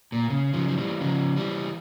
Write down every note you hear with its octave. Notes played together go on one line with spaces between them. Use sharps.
A#2
C#3
C#3 F3
F3
E3 G3
C#3 F3
E3 G3